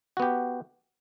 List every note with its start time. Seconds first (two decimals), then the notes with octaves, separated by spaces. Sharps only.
0.17 F#4
0.20 B3
0.22 G4